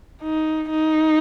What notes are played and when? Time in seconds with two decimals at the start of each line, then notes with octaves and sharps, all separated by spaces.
0.22 D#4
0.70 D#4